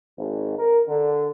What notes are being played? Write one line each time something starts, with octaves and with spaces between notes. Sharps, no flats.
G#1
A#4
D3